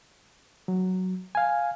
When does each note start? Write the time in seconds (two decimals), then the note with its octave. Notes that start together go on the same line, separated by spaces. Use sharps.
0.68 F#3
1.35 F5 G#5